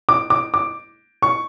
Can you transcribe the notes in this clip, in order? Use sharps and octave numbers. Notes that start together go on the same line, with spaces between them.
D6
D6
D6
C#6